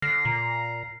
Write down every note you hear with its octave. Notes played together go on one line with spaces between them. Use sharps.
D3 F6 A#6 C7
A#2 A#5